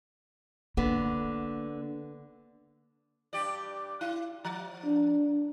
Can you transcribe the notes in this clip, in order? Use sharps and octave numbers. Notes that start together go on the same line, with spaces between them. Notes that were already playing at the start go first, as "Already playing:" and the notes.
D3 A#3 B3
G2 G4 D5
E4
F3
D4